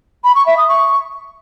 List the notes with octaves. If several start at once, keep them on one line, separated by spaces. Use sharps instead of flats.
B5
C#6
E5
D#6
C#6